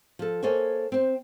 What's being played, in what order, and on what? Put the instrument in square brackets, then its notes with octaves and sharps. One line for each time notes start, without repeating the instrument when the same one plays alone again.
[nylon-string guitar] F3 A4
A#3 A4 C5 C#5 D#5 G#5
C4 C5